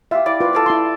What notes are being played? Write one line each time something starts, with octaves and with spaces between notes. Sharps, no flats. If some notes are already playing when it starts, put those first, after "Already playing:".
F4 G4 E5
E4 D5 D6
F4 B4
A4 D5 F5
E4 C6